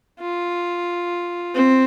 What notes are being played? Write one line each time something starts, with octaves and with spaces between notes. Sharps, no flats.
F4
C4